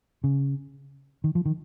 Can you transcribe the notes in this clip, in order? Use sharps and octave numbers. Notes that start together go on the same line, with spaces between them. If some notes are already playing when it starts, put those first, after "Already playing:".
C#3
D#3
F3
D#3